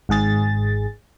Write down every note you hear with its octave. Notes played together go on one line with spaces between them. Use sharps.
G#1 G#2 G#4 A6